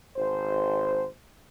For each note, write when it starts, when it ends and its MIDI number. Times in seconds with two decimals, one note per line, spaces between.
0.16 1.06 32
0.16 1.06 72